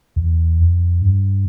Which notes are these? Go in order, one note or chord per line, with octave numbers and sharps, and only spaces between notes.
E2
F2
G2